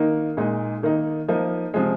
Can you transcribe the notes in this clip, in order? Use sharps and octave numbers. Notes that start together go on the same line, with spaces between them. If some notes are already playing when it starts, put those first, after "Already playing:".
Already playing: D#3 A#3 D#4
A#2 G#3 D#4
D#3 A#3 D#4
F3 A#3 D#4
C3 F3 G#3